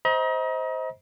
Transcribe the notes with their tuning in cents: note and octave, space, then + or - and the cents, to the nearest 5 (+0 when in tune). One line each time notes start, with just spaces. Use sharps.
C5 +0 D#5 +35 A#5 +40